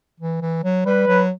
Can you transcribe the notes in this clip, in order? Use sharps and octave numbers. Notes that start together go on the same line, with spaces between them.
E3
E3
F#3
G3 B4
F#3